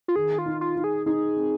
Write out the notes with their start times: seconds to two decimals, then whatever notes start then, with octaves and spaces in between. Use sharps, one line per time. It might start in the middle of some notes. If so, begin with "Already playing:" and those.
0.08 F4
0.16 D#3 G#4
0.38 F4
0.46 D#4
0.61 F4
0.76 D#4
0.84 G#4
1.06 D#4 G#4
1.36 C4